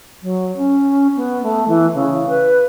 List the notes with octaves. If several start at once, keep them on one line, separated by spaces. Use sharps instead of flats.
F#3
C#4
B3
A3
E3
C#3
B4